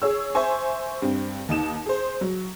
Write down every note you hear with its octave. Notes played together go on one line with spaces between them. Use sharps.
G#4 C#5 E6
C5 E5 G#5 C#6
G2 C4
D#2 D#4 E7
G#4 C5
F#3